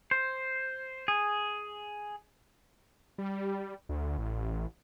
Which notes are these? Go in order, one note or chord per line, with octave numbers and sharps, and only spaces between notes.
C5
G#4
G3
D2
A1